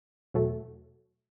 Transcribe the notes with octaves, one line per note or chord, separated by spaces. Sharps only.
E2 B2 F#3 A3